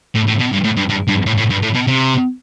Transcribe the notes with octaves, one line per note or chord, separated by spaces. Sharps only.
A2
A2
B2
G2
A2
G2
G2
G2
A2
A2
G2
A2
B2
C3